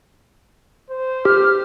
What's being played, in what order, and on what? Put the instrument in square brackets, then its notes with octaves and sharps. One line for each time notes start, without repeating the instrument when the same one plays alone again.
[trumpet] C5
[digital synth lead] G4 [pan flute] F6